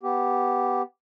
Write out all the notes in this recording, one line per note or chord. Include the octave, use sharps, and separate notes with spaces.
B3 G4